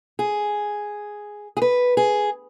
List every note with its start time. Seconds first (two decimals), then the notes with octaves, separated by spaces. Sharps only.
0.19 G#4
1.57 G#4
1.62 B4
1.97 G#4